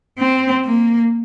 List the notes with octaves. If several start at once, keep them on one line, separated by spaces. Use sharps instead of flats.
C4
A#3